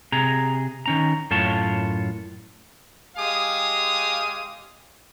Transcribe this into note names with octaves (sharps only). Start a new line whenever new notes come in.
C3 G#4 A#5
D#3 C#4 A#5
F#2 A2 F4 C#5 A5
G#3 G4 F5 G#5 D#6